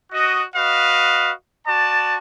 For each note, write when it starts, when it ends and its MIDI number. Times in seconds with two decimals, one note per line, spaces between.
0.12 0.42 66
0.12 0.42 75
0.56 1.32 66
0.56 1.32 71
0.56 1.32 75
0.56 1.32 77
1.67 2.17 66
1.67 2.17 74
1.67 2.17 81